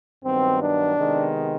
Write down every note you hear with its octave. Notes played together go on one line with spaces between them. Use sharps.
G2 D#3 F#3 B3 C4
D4
C3 D#3 G#3 B3